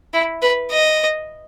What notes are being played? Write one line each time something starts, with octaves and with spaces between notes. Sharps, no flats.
E4
B4
D#5